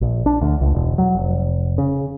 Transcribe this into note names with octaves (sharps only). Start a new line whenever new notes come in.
A#1
D4
D2
C#2
E1
F#3
F1
C#3